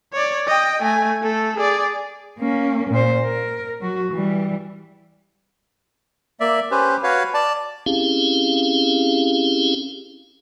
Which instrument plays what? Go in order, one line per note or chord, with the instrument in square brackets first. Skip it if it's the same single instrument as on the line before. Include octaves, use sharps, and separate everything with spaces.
[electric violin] C#5 D5
D#5 G5
A3 G#5
A3 A4
G#4 D5
[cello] A#3 C#4
A#2 C5
A#4
F#3 F#4
E3 G3
[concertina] A#3 D5 E5
C#4 G4 B4 C5
F#4 B4 C#5 F5
D5 A5
[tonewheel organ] C4 C#4 E4 G4 G#4 F5